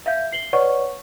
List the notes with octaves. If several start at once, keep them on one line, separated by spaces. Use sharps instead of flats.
E5 F5 G6
C7 F#7 G7
B4 C#5 D5 F#5 C#6